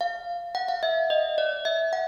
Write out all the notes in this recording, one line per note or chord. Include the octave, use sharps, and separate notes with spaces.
F5
F#5
F5
E5
D#5
D5
E5
F#5